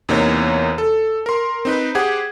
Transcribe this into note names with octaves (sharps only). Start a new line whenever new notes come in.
E2 C3 A#3 D#4 C5 C#5
A4
A#4 C6
C4 D#4 B4
G4 G#4 C5 F#5 G#6